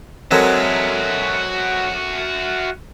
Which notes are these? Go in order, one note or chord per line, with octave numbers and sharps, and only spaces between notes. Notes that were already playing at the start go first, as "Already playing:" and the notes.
F#3 G#3 C4 F#4 A4 A#4 E5